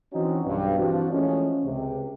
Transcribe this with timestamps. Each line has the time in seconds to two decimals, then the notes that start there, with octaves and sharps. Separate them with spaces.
0.13 E3 C4 C#4 D#4 F#4
0.45 B1 G2
0.77 E3 F3 C4 D4 F#4
1.11 E3 F3 G#3 A3 C#4
1.64 C#2 C3